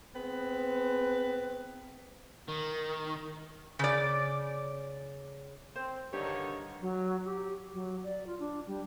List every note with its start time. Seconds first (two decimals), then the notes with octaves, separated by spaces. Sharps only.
0.14 G#3 B3 C4 B4
2.49 D#3
3.79 C#3 D5
5.76 C4 C5
6.13 G2 D3 D#3 G4 C#5
6.81 F#3
7.25 G4
7.73 F#3
8.04 D5
8.27 F4
8.39 D4
8.67 G3